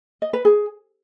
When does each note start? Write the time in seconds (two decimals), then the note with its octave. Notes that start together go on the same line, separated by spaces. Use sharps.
0.22 D#5
0.33 B4
0.45 G#4